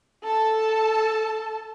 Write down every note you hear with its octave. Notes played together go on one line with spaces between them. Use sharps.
A4 A5